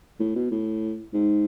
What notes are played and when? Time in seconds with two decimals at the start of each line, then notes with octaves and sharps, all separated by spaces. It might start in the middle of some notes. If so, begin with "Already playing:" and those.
0.20 A2
0.35 B2
0.51 A2
1.13 G#2